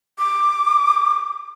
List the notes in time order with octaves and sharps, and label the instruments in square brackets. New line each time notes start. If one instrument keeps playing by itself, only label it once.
[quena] D6